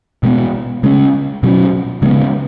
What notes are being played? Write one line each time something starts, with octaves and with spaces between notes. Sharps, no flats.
B2 G#3 B3
C#3 G#3 C#4
B2 F#3 C#4
C#3 G#3 B3